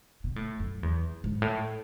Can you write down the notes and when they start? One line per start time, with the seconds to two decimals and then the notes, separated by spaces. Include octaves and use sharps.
0.24 B2
0.36 A2
0.60 F#2
0.83 E2
1.24 G#2
1.42 A2